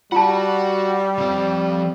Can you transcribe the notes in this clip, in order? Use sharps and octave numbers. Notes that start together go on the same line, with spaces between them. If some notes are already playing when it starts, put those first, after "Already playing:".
G3 F4 F#4 F#5 A5
F3 C4